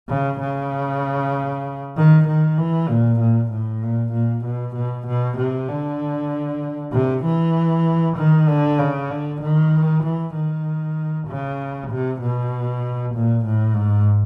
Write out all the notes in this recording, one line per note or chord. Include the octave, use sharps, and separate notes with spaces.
C#3
C#3
D#3
D#3
E3
A#2
A#2
A2
A#2
A#2
B2
B2
B2
C3
D3
C3
E3
D#3
D3
C#3
D3
D#3
E3
D#3
C#3
C3
B2
A#2
A2
G#2